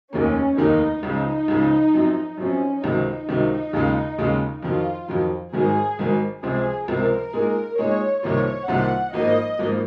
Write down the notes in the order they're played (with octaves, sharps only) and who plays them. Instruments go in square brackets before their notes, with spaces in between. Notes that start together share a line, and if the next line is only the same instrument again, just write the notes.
[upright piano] F1 D#2 D#3 A#3 [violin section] C#4
[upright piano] F1 D#2 D#3 A#3 [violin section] D#4
[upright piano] C#2 C#3 F3 [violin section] D#4
[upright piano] C#2 C#3 F3
F#2 F3 C4
[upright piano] F#2 F3 C4 [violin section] C#4
[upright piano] C#2 C3 D#3 F#3 [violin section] D#4
[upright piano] C#2 C3 D#3 F#3
D#2 C#3 G#3 C#4 F4
D#2 C#3 G#3 C#4 F4
[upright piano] F2 D#3 F#3 [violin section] F4
[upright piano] F2 D#3 F#3
[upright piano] G#1 G#2 D#3 F#3 [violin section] G#4
[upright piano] G#1 G#2 D#3 F#3
[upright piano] C#2 C3 F3 C4 F4 [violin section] G#4
[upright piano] C#2 C3 F3 C4 F4 [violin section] A#4
[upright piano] A#2 G#3 D#4 G#4
[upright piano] A#2 G#3 D#4 G#4 [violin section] C#5
[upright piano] C2 C3 D#3 A#3 F4 [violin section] C#5
[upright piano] C2 C3 D#3 A#3 F4 [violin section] F#5
[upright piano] G#1 G#2 F3 A#3 [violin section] D#5
[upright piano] G#1 G#2 F3 A#3